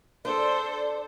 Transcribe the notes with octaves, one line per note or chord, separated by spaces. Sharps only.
D4 A4 C5 D5